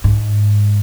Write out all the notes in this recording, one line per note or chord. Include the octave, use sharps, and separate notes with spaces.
G#2